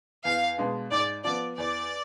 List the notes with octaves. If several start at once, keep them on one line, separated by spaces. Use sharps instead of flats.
E2 F5
B2 G#3 D4
G#2 D5
F3 B3 D5
E2 D5